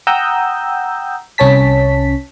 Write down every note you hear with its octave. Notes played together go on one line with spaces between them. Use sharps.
F#5 G5 A#5 D#6 E6 G6
C2 C#4 C#5 A5 B6